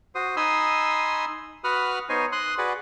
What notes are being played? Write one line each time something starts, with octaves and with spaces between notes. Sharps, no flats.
F#4 C5 D#6
D#4 G#5 B5 C6 D#6 E6
F#4 B4 F#5 B5 D#6 F6
B3 D#4 C5 C#5 D#5 G#5
C6 D#6 F#6
F#4 G#4 B4 D5 F#5